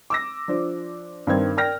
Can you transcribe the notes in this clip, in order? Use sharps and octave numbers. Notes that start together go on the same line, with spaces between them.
D6 E6 A#6
F3 D4 C5
G2 D#3 C4 G#6
A#4 D5 G5 F6 A#6